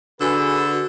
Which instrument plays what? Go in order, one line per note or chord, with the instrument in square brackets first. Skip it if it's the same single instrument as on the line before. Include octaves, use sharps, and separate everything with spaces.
[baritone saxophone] D3 [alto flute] F#4 [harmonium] G#4 B4 [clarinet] E6